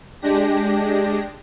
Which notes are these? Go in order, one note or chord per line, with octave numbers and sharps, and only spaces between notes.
G#3 D4 G4 A#6